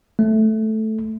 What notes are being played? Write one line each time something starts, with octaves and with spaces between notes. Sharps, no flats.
A3